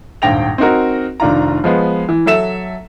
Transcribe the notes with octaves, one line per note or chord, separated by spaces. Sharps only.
D#1 G#1 G2 G5 A#6 F7
C4 D#4 F#4 A#4
F1 D#3 D4 F4 A#5
F3 G#3 B3
E3
F#3 A4 E5 E7